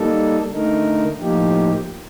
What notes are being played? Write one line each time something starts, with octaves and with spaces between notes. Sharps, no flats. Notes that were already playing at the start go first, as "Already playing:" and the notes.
Already playing: G3 A#3 D#4 A4
D3 A3 D#4 A#4
A2 F3 A#3 D#4 G4